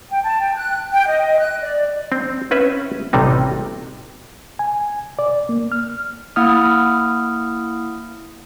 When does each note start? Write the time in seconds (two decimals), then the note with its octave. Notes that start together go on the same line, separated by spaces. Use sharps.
0.09 G5
0.23 A5
0.40 G5
0.56 F#6
0.92 G5
1.08 D#5
1.39 F#6
1.62 D5
2.12 C4
2.51 C4 C#4 B4 E5
3.13 A1 C3 G3 D#4
4.59 G#5
5.19 D5
5.49 A#3
5.72 F6
6.36 A#3 E4 F#5 D#6 F6